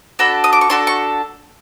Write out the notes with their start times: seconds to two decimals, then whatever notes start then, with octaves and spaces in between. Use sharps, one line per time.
0.19 D4 F#4 A4 B5
0.44 D#6
0.53 D6
0.61 C#6
0.70 D4 F#4 A4 C6
0.87 C#6